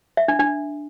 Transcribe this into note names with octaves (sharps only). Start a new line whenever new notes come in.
E5
D4
D4